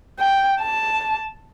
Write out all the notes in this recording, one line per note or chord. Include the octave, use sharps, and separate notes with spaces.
G5
A5